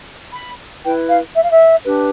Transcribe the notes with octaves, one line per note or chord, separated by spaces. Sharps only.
B5
E4 B4 G5
F5
E5
F5
E5
D4 G4 B4